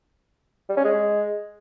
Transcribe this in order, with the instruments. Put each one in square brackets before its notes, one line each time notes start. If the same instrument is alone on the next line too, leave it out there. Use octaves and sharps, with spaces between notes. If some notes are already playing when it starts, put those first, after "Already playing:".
[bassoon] G3
C#4
G#3